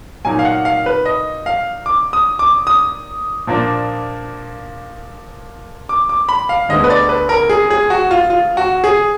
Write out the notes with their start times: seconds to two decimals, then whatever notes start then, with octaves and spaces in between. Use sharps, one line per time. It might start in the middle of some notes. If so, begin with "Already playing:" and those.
0.25 A#2 F#3 A#3 D#4 G#5
0.39 F5
0.45 F#5
0.65 F5
0.86 B4
1.05 D#5
1.46 F5
1.86 D6
2.13 D#6
2.39 D6
2.67 D#6
3.47 A#2 F3 A#3 D4
5.89 D6
6.09 D6
6.29 B5
6.49 F5
6.69 D2 D3 G#3 B3 D#5
6.84 B4
6.90 D5
7.09 B4
7.29 A#4
7.50 G#4
7.70 G#4
7.90 F#4
8.11 F4
8.30 F4
8.57 F#4
8.84 G#4